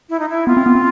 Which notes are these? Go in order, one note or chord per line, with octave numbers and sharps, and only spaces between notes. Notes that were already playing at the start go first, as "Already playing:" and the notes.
E4
D#4
E4
B3 F4
C4
B3
C4